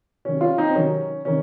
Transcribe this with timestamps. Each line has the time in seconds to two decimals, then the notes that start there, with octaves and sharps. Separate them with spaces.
0.25 C3 D#3 F#3 C#4
0.41 C#4 F4
0.58 C4 D#4
0.75 C3 D#3 F#3 C#4
1.25 C3 D#3 C#4